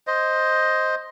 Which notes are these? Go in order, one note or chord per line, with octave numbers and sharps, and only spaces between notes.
C5 D#5